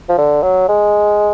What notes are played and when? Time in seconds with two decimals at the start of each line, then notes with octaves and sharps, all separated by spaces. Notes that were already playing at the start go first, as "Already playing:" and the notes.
0.09 F3
0.18 D3
0.43 F#3
0.68 G#3